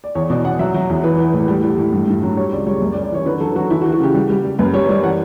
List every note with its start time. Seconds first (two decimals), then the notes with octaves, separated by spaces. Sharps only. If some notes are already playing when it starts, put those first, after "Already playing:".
0.04 D5
0.15 E2 C#5
0.30 B2 D5
0.45 B2 F#5
0.59 F#3 E5
0.74 F#3
0.89 E2
1.04 E3 B4
1.19 E3
1.34 A2
1.48 G3
1.63 G3
1.78 A2
1.92 G2
2.08 G2
2.23 F#3
2.37 G3 C#5
2.52 C#2 D5
2.67 G3 C#5
2.82 F#2
2.92 D5
2.96 G3
3.04 D5
3.11 E3 C#5
3.26 D3 B4
3.40 F#3 A4
3.56 F#3 F#4
3.70 E3 E4
3.81 F#4
3.85 E3
3.92 F#4
4.00 C#3 G4
4.15 G3
4.30 G3
4.44 G3
4.59 F#2 B4
4.74 G3 C#5
4.89 G3 D5
5.03 E3 F#5